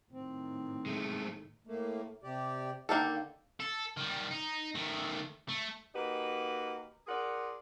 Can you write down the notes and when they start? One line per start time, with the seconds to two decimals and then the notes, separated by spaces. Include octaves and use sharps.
0.12 A2 D#3 C4
0.86 G#3 A3
1.67 A2 A3 A#3
2.23 C3 G4 D5
2.89 D3 D#3 A#3 G4 A4
3.60 A4
3.97 D#3 G3
4.31 D#4
4.75 D#3 A3
5.49 A3
5.94 A#3 D#4 F#4 G4 B4
7.07 F4 G#4 A#4 D5 F#5